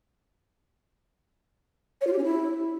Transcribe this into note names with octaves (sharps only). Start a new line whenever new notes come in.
C#5
F4
G4
C#4
E4